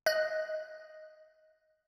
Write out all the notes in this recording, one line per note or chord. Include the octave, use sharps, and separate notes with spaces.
D#5 F#6